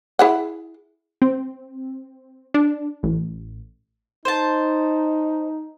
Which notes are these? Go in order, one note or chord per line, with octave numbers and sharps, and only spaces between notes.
E4 G#4 F#5
C4
D4
A1
D#4 C5 A5